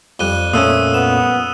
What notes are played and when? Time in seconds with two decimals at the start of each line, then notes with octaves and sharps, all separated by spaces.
0.19 F2 G3 F#6 D#7 G7
0.53 A#2 A3 C#4 D#6 E6 D#7
0.94 B3 E7